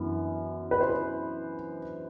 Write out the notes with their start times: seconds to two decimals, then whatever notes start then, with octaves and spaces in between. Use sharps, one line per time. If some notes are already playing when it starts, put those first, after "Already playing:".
Already playing: F#2 E3 B3 D4
0.71 B4
0.81 C5
0.89 B4